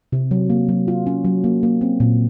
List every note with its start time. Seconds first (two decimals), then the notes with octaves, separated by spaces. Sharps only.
0.12 C3
0.31 F#3
0.50 A#3
0.69 F#3
0.88 F4
1.07 C#4
1.25 F#3
1.44 A#3
1.63 A#3
1.81 C4
2.00 A#2